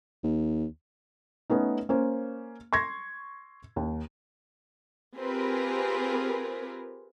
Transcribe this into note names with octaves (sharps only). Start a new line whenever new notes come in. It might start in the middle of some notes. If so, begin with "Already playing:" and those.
D#2
A3 B3 C#4 D#4
A#3 C#4 C5
C6 C#6 G#6 A#6
D#2
C4 F4 G4 G#4 A#4 B4